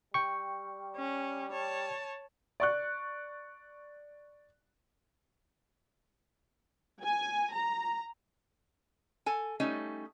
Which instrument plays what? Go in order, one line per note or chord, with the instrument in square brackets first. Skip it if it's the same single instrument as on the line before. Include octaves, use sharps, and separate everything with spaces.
[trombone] G3 [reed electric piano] G5 C#6
[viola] C#4
C#5 A5
[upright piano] D5 C#6 F#6
[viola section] G#5
A#5
[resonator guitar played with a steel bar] A4 G#5
G3 A3 C#4 D#4